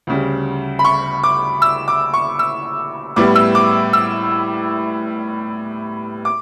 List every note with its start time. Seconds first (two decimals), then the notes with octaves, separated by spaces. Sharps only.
0.07 D2 C#3 G3
0.79 B5
0.85 C#6
1.24 D6
1.62 E6
1.88 D6
2.14 C#6
2.39 E6
3.16 A2 G3 B3 E4 D6
3.35 E6
3.55 D6
3.93 E6
6.25 D6